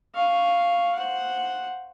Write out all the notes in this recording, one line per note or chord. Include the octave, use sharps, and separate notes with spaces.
F5 C#6
C5 F#5